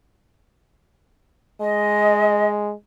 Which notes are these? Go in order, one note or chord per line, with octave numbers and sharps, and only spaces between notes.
G#3 D#5